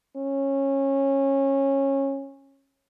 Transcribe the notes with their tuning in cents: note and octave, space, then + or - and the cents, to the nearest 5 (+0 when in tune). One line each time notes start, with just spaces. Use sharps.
C#4 -20